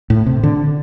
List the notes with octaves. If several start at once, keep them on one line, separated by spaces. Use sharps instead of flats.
A2
C3
D3